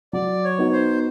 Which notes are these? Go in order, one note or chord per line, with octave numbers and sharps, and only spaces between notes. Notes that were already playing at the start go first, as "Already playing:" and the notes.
F#3 D5
C#5
B3 D#4 F#4
C5